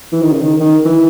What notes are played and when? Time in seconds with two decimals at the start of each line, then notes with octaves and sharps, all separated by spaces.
0.13 E3
0.23 D#3
0.32 C#3
0.42 D#3
0.60 D#3
0.85 E3